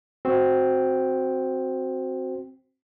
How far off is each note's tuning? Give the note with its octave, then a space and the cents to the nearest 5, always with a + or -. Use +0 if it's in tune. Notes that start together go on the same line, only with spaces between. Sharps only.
C4 +0 F#4 +0